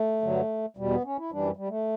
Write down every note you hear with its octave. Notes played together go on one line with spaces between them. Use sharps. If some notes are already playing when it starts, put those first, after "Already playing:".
Already playing: A3
G2 D3 F#3
E2 B2 G3
B3
C#4
E4
F#2 E3 G3 D4
G3
A3